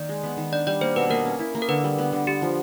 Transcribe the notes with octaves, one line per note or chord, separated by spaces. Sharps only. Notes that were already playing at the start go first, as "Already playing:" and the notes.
Already playing: D#3 A#3 D5
G#3
B3
D#3
D4 D5
G3 D5
A#3 C5
B2 B4
A#3 A#4
C#4
E4
A#3
A#4
D3 B4
G3
B3
D3
B3 G4
F3